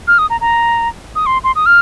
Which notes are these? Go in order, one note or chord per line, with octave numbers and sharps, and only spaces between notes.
F6
D#6
A#5
A#5
D#6
C6
C6
D#6
F6